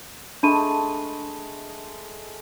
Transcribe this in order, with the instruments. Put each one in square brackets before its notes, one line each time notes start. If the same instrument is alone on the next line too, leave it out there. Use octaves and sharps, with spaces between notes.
[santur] G#3 A3 A5 [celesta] D4 B5 D#7